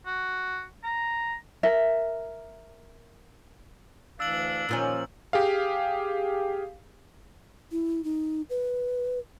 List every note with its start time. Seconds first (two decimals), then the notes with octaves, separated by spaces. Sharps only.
0.06 F#4
0.83 A#5
1.63 A#4 E5
4.20 D2 E3 D4 F5 E6 F#7
4.69 A#2 D#3 F3 C#4
5.33 G4 G#4 F5
7.72 E4
8.04 D#4
8.50 B4